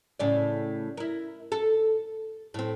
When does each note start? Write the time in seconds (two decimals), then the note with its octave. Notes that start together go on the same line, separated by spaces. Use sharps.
0.20 A2 C#3 D5
0.97 E4 A#4
1.52 A4
2.54 A2 C4